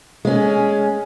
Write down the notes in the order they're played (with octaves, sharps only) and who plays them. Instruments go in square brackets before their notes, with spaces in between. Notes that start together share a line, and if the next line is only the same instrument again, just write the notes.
[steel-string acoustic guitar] G#3 C#4